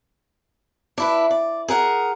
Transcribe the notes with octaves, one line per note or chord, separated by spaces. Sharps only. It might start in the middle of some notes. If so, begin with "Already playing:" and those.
D4 E4 B4
D5
G#4 A#4 F#5